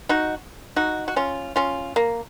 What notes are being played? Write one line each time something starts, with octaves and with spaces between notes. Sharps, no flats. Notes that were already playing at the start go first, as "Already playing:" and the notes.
D#4 F#4
D#4 F#4
F#4
C#4 F4
C#4 F4
A#3